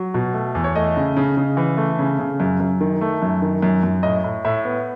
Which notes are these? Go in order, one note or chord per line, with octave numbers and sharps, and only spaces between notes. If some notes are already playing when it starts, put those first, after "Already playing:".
Already playing: F#3
B2
A3
E2
C#5
A3 D#5
C#3
C#3
C#3
E3
A3
C#3
C#3
F#2
F#2
D#3
A3
F#2
D#3
F#2
F#2
A2 D#5
A2
A2 E5
B3